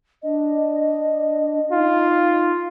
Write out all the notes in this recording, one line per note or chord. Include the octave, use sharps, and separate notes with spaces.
D4 D#5
D#4 F4